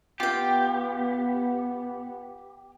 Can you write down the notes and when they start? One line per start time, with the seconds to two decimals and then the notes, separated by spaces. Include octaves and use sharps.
0.20 B3 F4 G4 G5